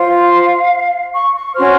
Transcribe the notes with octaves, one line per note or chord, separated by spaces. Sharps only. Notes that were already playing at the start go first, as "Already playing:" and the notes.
Already playing: F4 C5
F5
C#6
C#6
C#4 F#4 C5 F6